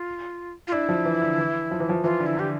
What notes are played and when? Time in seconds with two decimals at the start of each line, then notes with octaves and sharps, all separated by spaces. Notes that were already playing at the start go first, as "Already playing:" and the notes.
Already playing: F4
0.68 F4
0.72 D4 E4
0.89 F3
1.05 E3
1.22 D3
1.38 E3
1.71 F3
1.80 E3
1.89 F3
2.04 E3 F4
2.20 D3
2.26 E4
2.37 D3 G4